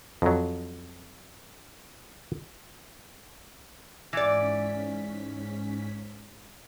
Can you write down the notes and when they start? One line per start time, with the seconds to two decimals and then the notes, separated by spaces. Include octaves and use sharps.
0.22 F2 F#3
4.13 G#2 E3 C#4 D5 B6